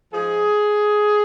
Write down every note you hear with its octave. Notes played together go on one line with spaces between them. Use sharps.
G#2 F3 G#4